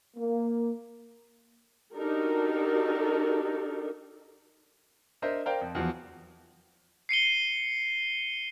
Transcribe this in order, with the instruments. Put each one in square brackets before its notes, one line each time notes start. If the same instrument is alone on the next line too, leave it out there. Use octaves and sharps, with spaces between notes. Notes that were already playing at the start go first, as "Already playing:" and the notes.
[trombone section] A#3
[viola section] D4 D#4 F#4 G4 A4 A#4
[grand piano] D4 A#4 C5 D#5 E5
A#4 C5 D5 F5 G5 A#5
F2
E2 F3 F#3
[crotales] C7 C#7 D#7 G7